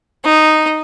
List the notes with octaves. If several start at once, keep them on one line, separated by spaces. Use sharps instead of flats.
D#4